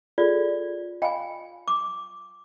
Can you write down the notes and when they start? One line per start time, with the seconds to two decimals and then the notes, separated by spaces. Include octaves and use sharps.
0.18 F4 G#4 A4 D5
1.02 D#5 F5 G5 G#5 B5
1.68 D6